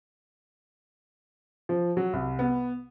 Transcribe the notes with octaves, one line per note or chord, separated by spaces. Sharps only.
F3
F#3
C2
B3